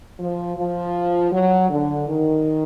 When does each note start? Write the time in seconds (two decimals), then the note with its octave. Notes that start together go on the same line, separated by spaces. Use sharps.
0.19 F3
0.57 F3
1.32 F#3
1.69 D3
2.07 D#3